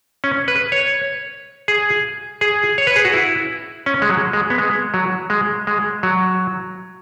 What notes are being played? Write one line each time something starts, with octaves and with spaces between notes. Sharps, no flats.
C#4
B4
C#5
G#4
G#4
C#5
B4
G#4
F#4
E4
C#4
G#3
F#3
G#3
B3
G#3
F#3
G#3
G#3
F#3